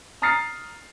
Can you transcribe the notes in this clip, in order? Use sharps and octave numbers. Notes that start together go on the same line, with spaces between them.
A#5 D#6 F6 A6 C7 C#7